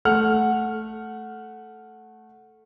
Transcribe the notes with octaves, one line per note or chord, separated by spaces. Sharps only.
A3 F#5 F6